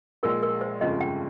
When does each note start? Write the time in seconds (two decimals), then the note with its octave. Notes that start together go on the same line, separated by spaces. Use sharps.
0.23 A#1 A#2 G#3 A#4
0.42 A#4
0.61 C5
0.81 G1 F2 C#3 F3 G#3 D#5
1.00 G5